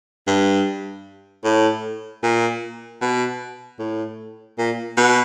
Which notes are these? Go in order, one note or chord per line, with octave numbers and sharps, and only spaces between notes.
G2
A2
A#2
B2
A2
A#2
B2